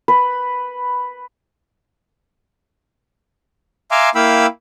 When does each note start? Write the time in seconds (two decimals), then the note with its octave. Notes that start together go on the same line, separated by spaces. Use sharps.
0.08 B4
3.91 E5 F5 G#5 A#5 C6 D6
4.15 A#3 E4 F5 G5 B5 E6